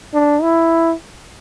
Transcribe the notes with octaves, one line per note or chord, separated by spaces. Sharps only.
D4
E4